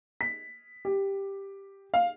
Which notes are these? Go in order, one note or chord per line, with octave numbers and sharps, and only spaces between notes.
B6
G4
F5